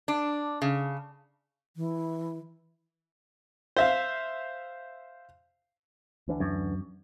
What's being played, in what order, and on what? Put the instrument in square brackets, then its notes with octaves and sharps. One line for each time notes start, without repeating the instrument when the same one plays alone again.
[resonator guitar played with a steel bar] D4
C#3
[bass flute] E3
[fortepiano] C5 E5 F5
[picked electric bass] D2 E3 D4
[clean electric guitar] F#2